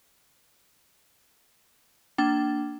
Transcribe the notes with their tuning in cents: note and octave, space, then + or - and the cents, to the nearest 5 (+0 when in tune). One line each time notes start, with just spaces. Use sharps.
A#3 -10 D4 +0 G5 -35